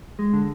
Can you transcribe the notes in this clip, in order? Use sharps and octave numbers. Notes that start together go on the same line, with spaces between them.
G#3
D3